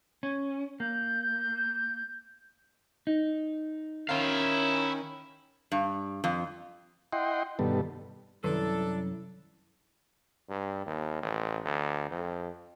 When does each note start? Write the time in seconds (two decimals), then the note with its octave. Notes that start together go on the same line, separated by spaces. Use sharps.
0.23 C#4
0.80 A#3 G6
3.07 D#4
4.09 D#3 C#4 E4 F5
5.72 G2
6.24 F2
7.13 E4 D#5 F#5 G5 C6
7.59 G2 B2 D#3 G3 B3 A4
8.44 C2 F#2 D#3 D4 E4 A4
10.49 G2
10.86 D#2
11.23 A1
11.64 D2
12.11 F2